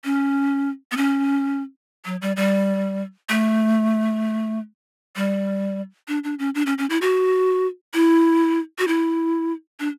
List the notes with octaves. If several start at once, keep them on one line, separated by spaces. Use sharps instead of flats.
C#4
B3
C#4
F#3
G3
G3
A3
G3
D4
D4
C#4
D4
C#4
C#4
E4
F#4
E4
F#4
E4
D4